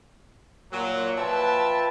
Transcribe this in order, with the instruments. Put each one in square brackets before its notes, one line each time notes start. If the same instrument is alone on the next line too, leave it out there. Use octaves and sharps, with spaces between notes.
[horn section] A#2 F#3
F3 B4 E5 G5 A5